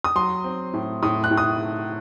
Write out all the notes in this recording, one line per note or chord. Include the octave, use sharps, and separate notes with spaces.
D#6
F#3 C6
C4
A2
A2 D#6
F#6
A2
D#6